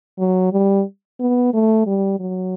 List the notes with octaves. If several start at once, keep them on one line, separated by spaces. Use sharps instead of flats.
F#3
G3
B3
A3
G3
F#3